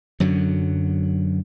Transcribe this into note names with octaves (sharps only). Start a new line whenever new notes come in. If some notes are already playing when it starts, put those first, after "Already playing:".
F#2 D3 F#3